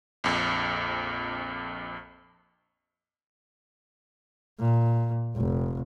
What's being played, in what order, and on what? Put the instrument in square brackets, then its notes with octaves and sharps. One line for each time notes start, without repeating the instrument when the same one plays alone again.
[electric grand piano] A#1 F2
[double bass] A#2
F1